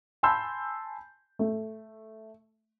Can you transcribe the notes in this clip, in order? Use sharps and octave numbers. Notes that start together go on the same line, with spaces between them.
G#5 A5 B5 C6 E6 G6
A3